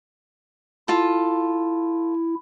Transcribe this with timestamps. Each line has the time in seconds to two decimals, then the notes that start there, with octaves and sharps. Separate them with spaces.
0.88 E4 F4 A4